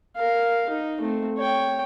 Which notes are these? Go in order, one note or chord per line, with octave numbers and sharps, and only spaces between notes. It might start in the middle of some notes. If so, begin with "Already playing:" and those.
A#4 F5
D#4
A3 C4
C#5 G5